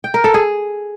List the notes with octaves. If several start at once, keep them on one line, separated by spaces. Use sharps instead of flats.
G5
A#4
A4
G#4